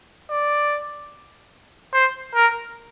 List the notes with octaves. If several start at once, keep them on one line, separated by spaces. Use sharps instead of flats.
D5
C5
A#4